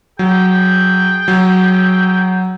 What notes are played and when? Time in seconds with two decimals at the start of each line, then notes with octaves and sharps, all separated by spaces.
0.19 F#3 G#4 G5
1.28 F#3